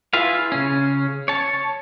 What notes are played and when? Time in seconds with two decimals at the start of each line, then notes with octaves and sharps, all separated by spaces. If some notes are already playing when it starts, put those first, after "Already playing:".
0.13 E4 F4 G#4 B4 F5
0.52 C#3 C#4
1.28 C#5 A5